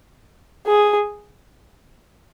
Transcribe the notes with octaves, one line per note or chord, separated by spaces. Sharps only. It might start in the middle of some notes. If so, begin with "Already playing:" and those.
G#4